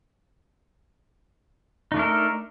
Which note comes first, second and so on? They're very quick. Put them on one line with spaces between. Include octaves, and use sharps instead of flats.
D#4 A3 D4 A#4 A4